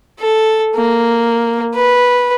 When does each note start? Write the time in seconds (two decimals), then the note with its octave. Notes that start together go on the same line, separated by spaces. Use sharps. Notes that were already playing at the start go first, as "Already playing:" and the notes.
0.20 A4
0.76 A#3
1.75 B4